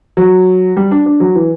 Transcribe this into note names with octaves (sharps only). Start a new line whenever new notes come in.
F#3
G3
D4
D4
F#3
E3